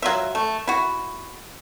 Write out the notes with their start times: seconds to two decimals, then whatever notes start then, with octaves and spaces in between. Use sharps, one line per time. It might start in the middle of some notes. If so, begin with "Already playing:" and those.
0.02 F#3 F4 E5
0.35 A3
0.67 E4 F#4